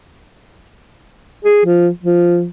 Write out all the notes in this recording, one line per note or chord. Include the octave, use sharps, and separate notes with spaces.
G#4
F3
F3